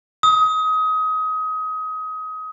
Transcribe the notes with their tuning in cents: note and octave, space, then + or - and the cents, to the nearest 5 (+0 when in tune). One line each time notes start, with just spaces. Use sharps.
D#6 +25